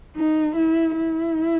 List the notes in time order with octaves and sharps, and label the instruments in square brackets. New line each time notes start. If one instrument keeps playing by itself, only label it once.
[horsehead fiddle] D#4
E4
E4